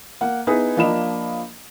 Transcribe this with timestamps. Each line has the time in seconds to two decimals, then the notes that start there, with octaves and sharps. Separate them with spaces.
0.21 A#3 F#5
0.47 B3 D#4 E4 G#4 B4
0.77 F3 A#3 D4 D#5 B5 E7